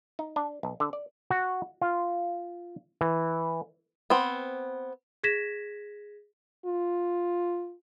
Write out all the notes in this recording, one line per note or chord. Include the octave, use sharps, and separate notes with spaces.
D#4
D4
B1
D3
D5
F#4
F4
E3
B3 C4
G#4 G#6 A#6 B6 E7
F4